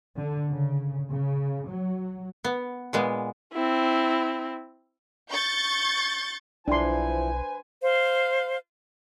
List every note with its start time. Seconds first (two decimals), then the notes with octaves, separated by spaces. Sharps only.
0.17 D3
0.50 C#3
1.10 C#3
1.69 F#3
2.44 B3
2.93 A#2 G#3 B3
3.53 C4 E4
5.31 C#6 G6 A6
6.68 B1 F3 D4 E4 B4 C5 G#5 C6
7.82 C5 F5